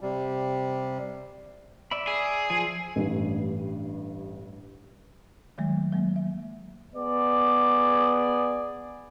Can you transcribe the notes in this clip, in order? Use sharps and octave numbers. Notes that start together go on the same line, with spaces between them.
C3 G3
D5 E5 B5
G#4
F3 G#5
A1 G2
D#3 F3 F#3 G#3 A3
F#3 G#3 A#3
E5
B3 G#4 D5